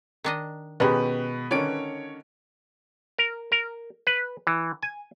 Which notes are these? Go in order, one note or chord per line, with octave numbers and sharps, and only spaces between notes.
D#3 D4 D#5
B2 D#3 G#3 C#4 G4 B4
D3 D#3 C#4 C#5 D5 D7
A#4
A#4
B4
E3
G#5